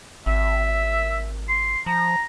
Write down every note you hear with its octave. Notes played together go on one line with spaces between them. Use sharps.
G#1 E5
C6
F3 A#5